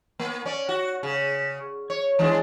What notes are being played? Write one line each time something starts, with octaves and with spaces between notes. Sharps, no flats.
A#3
C#4 D5
F#4
C#3
C#5
E3 G#3 D4